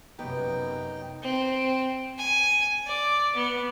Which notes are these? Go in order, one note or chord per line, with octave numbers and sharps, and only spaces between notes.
F#2 C3 B3 D#4 G5
C4
G#5
D5
B3